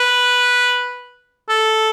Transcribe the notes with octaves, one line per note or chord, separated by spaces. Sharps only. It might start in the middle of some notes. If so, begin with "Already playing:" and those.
Already playing: B4
A4